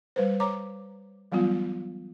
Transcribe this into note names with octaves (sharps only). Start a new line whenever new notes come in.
G3 B4 C5
C#5 A#5 D6
E3 F#3 G3 B3 F4